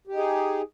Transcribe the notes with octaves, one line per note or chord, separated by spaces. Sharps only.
D#4 G4 G#4